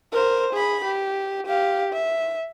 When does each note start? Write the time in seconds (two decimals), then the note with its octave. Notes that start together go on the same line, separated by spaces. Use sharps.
0.12 A#4 C5
0.53 G#4 B5
0.85 G4
1.47 G4 F5
1.93 E5